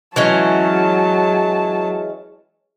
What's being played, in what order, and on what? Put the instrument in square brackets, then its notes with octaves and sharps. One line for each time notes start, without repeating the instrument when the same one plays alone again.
[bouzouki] E3 G#3 C#4 [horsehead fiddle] F#3 A5